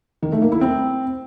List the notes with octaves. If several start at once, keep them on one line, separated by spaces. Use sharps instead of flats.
D#3
A3
A#3
E4
C4